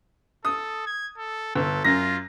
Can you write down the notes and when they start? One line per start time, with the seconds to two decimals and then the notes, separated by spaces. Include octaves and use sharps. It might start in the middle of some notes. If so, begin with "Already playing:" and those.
0.45 A4 D#6
0.86 G#6
1.18 A4
1.55 G1 A4
1.84 F#2 F4 A#6